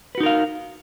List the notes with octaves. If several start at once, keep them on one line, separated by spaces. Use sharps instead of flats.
D#4 F#4 A#4 B4 F5